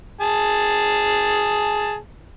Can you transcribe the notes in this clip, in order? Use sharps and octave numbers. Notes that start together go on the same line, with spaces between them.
G#4 A5